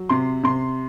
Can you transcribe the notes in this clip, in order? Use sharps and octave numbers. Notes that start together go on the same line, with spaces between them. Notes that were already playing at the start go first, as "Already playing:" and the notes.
Already playing: F#3
C3 C6
C3 C6